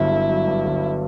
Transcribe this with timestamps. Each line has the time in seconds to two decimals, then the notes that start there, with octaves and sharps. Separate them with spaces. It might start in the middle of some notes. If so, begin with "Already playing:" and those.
Already playing: G1 G2 F#3 E4
0.12 G1
0.29 F#3
0.47 G2
0.65 G1